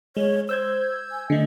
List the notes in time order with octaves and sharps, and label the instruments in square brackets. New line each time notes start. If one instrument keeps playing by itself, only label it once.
[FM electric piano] G#3 [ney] C#5
[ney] C5 [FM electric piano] E6 G6 G#6
[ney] G#5
[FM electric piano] D3 A3 [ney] D#5